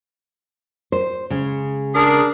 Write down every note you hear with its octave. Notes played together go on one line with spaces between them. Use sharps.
C5
C#3 G#3
D4 G#4 A#4